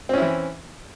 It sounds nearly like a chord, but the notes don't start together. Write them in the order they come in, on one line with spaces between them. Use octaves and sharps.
C4 C#4 E4 E3